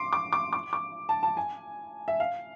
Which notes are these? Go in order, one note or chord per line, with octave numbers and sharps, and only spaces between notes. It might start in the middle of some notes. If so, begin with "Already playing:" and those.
Already playing: C6 D6
D6
D6
D6
D6
A5
A5
G#5
E5
F5